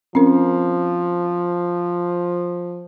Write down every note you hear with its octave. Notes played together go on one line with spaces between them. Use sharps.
F3 C4 C#4 A#4